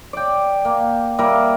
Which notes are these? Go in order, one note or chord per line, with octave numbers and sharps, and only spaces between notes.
D5 G5
A#3
G3 A#3 E4 A#4